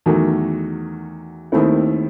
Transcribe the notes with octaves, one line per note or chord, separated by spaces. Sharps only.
E2 D#3 F#3 A3
D#2 D#3 A3 C4 E4